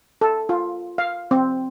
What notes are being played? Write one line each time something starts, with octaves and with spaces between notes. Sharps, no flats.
A4
F4
F5
C4